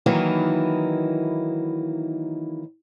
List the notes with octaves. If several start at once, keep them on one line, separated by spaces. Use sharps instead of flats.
D#3 E3 F#3 A#3 D#4 E4